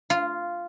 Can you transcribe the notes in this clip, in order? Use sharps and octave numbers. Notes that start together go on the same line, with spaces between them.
F4